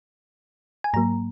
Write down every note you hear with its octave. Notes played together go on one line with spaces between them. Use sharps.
G#5
G#2 F#3 A#3 A#5